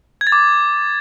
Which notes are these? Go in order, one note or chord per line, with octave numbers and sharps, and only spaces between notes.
G#6
A6
D6